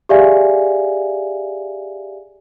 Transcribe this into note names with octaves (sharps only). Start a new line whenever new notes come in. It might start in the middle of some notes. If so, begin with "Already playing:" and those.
G4 G#4 D5 E5 F5 G#5